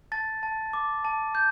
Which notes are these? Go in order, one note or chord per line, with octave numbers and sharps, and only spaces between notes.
A5 A6
A5
D6
A5
G6